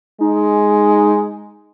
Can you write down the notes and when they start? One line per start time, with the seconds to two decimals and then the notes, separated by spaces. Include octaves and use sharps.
0.21 G#3 D#4